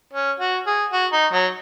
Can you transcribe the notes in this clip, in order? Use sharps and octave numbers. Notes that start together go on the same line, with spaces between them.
C#4
F#4
G#4
F#4
D#4
F#3